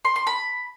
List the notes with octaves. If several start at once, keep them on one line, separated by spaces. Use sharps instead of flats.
C6
C6
B5